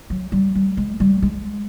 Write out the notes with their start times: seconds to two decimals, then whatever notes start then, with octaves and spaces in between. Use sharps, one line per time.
0.10 F#3
0.32 G3
0.55 G3
0.77 G#3
1.00 G3
1.22 G#3